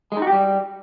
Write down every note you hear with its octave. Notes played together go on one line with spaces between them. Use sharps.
G#3
D#4
F#4
G4
G3